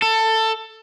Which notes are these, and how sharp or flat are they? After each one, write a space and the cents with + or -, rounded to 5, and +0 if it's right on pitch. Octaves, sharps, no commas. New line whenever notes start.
A4 +15